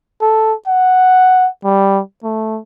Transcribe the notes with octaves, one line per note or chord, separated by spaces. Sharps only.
A4
F#5
G3
A3